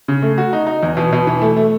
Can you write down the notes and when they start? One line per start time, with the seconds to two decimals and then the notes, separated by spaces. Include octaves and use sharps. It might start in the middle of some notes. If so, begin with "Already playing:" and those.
0.08 C#3
0.22 A3
0.38 F#4
0.53 D#4
0.67 D#4
0.83 E2
0.97 B2
1.12 B2
1.27 E3
1.41 A3
1.56 A3